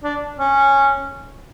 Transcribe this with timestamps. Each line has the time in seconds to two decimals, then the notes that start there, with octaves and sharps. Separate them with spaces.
0.03 D4
0.38 C#4